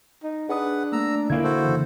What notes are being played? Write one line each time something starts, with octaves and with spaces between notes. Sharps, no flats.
D#4
D4 G#4 B4 F#5 D#6
A3 A#3 A#5 E6
A#2 D3 A3 A#3 E4 A#4 F5 G#6
F#4 A4 C5
F2 C#3 E3